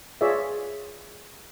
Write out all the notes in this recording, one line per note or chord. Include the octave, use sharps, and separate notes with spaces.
F4 G#4 B4 C#5 D5 E5